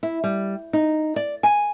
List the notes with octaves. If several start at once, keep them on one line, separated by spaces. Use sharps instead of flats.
E4
G3
D#4
D5
G#5